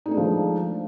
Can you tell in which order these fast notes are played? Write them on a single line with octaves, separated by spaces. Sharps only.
D#4 A3 D4 G#3 F3